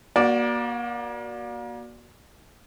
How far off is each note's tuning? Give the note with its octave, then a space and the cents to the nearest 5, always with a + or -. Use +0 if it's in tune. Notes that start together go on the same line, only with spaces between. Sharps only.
A#3 +35 F#4 +0 D5 +0